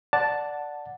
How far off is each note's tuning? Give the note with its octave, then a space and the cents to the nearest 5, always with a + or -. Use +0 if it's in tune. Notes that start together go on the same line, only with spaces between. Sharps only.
D5 +0 F#5 -5 A5 +0